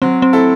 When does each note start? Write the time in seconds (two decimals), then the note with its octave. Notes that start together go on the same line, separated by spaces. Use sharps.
0.02 F#3 C4
0.22 C4
0.33 A3 E4 A4